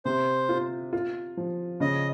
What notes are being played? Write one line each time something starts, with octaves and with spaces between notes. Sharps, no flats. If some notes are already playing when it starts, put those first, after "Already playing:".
C3 C5
F4
F4
F3
C#3 D#5